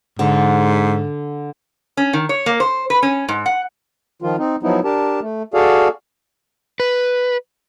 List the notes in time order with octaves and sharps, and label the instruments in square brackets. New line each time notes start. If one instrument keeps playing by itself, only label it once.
[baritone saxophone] G#2 [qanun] D3
[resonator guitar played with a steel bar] C#4
D#3
C#5
A#3
C5
B4
C#4
G#2
F#5
[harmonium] D#3 F3 F4
C4 D#4
F3 F#3 B3 D#4 E4
D4 G4 A#4 A5
A3
F#4 G#4 A4 D5 F5
[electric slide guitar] B4